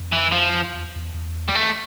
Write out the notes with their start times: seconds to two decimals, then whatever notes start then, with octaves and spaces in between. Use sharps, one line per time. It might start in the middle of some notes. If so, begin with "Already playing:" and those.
Already playing: F2
0.13 E3
0.32 F3
0.74 E2
0.96 E2
1.14 E2
1.48 G3
1.55 A3